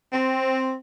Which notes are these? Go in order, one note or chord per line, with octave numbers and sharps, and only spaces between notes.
C4